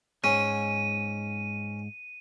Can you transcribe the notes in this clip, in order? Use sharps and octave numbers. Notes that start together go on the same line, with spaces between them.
G#2 C#4 G#4 D#7